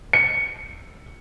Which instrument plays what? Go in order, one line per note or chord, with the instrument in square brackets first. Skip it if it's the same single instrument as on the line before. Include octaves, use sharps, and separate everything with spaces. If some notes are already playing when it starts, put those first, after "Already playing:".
[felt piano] C#7